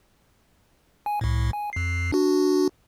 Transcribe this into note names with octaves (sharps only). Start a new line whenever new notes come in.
G#5
C2 A2
G#5
F2 C7
D4 F#4